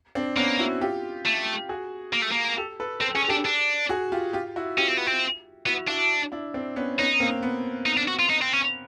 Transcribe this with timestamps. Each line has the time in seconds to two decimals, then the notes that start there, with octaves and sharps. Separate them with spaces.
0.15 C4 D4
0.37 A#3 B3 C#4
0.59 E4 F#4
0.81 F4 G4
1.26 A3
1.69 F#4 G#4
2.13 A#3
2.22 A3
2.31 A#3
2.57 G4 A4
2.80 A4 B4
3.01 C4 A4
3.15 C#4 G#4
3.28 D4 G4 A4
3.45 D4
3.89 F#4 G#4
4.12 F4 G4
4.33 F4 G4
4.56 E4 F#4
4.77 C#4 F4 G4
4.88 C4
4.97 B3
5.06 C4
5.66 B3 E4 F#4
5.88 D4 E4 F#4
6.32 D4 E4
6.54 C4 D4
6.76 B3 C#4
6.98 B3 C#4 D#4
7.20 A#3 C4
7.43 B3
7.86 D#4
7.97 D4
8.08 F#4
8.19 F4
8.30 D#4
8.42 C4
8.53 C#4